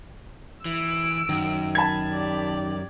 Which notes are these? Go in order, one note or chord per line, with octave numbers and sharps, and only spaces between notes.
E3 E6 D7
F#2 D#3
A5 B5 G#6
G4 D5